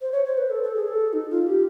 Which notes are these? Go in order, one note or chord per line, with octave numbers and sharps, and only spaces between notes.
C5
C#5
C5
B4
A4
A4
G#4
A4
D#4
F4
G4